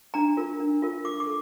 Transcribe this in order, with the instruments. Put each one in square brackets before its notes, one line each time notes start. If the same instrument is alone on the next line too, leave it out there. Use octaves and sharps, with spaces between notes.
[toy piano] D4 A#5
F4 A#4
D4
F4 A#4
F4 D6
D6
A4